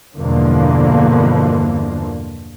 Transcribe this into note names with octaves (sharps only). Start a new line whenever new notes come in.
E2 G2 B2 D3 F3 A#3